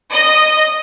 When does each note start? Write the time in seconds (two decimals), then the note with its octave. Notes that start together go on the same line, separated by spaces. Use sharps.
0.13 D#5